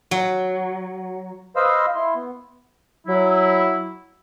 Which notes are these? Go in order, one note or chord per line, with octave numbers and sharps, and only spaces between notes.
F#3
B4 C5 D#5 F5 E6
E4 C6
B3
F#3 E4